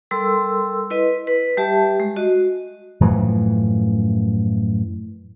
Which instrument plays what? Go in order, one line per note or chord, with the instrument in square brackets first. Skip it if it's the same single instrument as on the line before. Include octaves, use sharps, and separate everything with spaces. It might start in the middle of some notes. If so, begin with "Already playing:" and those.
[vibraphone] G3 A4 A#4 C6 E6
E4 B4 D#5
B4
G3 G4 E5 A5
G#3
F#4 D#5
[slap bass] F#2 A2 E3 F3